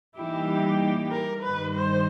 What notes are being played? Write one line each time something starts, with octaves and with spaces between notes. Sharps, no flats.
E3 G3 A#3 D#4 E4 G4
A#4
G2 D#3 G3 B4
C5